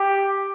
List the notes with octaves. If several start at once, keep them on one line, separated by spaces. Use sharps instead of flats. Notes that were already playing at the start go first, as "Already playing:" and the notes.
Already playing: G4